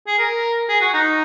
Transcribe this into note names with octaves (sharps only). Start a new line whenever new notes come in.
G#4
A#4
G#4
F#4
D#4